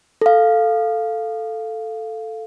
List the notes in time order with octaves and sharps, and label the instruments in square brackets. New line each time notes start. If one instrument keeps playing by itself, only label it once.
[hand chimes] A4 F5